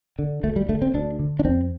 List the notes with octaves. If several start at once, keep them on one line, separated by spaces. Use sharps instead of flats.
D3
D2 A3
G3
D3 A3
C4
D2 D4
D3
D4
F2 C4